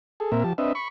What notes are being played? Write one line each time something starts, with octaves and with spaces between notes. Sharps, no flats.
G#4 A4
A#2 A#3 C4 A#4 E5
F3 G4 A5
C4 D4 B4 D#5 E5
B5 C#6